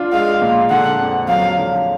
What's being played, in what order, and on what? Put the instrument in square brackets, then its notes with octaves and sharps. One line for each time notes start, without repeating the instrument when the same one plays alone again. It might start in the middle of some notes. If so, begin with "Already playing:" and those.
Already playing: [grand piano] D4 F4
[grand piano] G#3 [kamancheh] F5
[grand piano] A#2
[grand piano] D3 [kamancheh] F#5
[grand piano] F2
[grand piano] F#3 [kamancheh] F5
[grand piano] D3